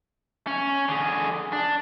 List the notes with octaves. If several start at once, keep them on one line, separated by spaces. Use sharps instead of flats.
C#4
D3 G#4
D4